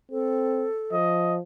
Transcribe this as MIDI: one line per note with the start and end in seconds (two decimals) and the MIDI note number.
0.11 0.67 60
0.11 0.95 69
0.92 1.40 53
0.92 1.35 75